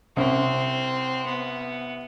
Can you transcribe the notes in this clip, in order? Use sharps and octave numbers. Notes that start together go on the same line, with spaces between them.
C2 C4 C#4
B3